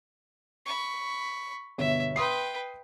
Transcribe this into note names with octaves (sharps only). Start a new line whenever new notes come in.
B5 C#6
G1 B2 C#5 E5
B4 G5 C6 D#6 C7